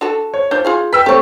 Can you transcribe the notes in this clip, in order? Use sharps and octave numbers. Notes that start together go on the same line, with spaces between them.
D4 F#4 A4
C#5
F3 D4 G6
F4 G#4 F5
B4 G5 E6 B6
A3 C4 G4 C#5